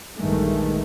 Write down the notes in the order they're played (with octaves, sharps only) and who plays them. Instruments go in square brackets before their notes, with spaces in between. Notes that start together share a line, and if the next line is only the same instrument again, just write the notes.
[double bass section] A#1 E2 G2 D#3 G#3 A3